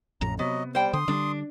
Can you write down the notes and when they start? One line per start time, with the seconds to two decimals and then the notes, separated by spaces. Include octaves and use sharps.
0.21 A1 F2 A2 A#5
0.39 C3 F#3 B3 D#5
0.75 G3 C5 G5
0.93 D3 C6 D#6
1.08 D3 G3 D4